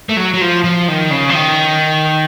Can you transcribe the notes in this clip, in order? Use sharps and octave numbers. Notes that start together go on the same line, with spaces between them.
A3
F#3
F#3
F3
F3
D#3
C#3
F3
D#3